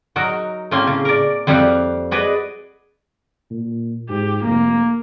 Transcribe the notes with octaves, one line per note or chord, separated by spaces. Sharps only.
F#3 D#4 F#4 A#4
A2 A#3 C4 C#4 C6
C#3
A#4 D5
F2 G3 E4 G4 F5 F#5
F#4 G#4 B4 D5 D#5
A#2
G#2 G4
F1 A#3